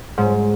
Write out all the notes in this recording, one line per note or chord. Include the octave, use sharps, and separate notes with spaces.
G#2